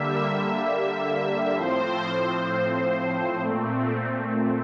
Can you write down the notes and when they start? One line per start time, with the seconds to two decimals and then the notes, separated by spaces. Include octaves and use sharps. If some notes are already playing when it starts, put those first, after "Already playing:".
Already playing: D3 G3 A#3 E5
1.56 A2 F3 C4 C5
3.40 A#2 A3 C4